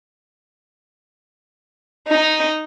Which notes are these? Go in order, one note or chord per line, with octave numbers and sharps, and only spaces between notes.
D#4